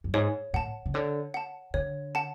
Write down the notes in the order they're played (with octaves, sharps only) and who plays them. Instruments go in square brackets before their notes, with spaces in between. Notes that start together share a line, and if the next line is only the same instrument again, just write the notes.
[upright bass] F#2
[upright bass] G#2 [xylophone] C#5
[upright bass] A2 [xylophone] F#5 A5
[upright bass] C#3
[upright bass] D3 [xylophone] C#5
[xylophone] F#5 A5
[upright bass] D3 [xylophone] C#5
[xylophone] F#5 A5